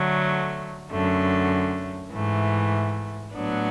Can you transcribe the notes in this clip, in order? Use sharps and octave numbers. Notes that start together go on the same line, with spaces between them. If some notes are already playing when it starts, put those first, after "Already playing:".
Already playing: D3 F#3 A3
F#2 D3 A3
G#2 E3 A3
A2 F#3 B3 D4